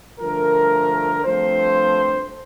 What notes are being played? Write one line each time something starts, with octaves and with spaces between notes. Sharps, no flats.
G2 D3 F3 A3 A#4
G2 F3 A3 C4 C5